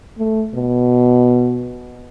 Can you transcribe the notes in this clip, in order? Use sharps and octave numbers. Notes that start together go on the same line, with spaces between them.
A3
B2